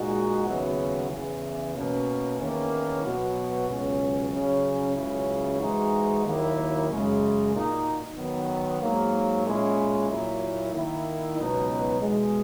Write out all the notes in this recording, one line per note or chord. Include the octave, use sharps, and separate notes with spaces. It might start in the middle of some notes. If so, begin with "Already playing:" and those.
Already playing: A#2 G#3 D#4 F#4
D#2 C#3 F#3 B3 E4
E2 C#3 E3
B2 A#3 C#4
E2 D#3 A#3 C#4 E4
B2 F#3 B3 F#4
C#2 B2 F#3 C#4
C#3 F#3 C#4
C#2 C#3 F#3 C#4 E4
G#2 E3 G#3 D#4 F#4
D#2 D#3 F#3 A#3 E4
F#2 C#3 G#3
A#2 A#3 D#4 F#4
D#3 F#3 B3
G#2 F#3 A#3
A#2 G#3 C#4 E4
A#2 F#3 A#3 E4
D#3 A#3 E4
C#2 B2 F#3 B3 D#4
E2 B2 G#3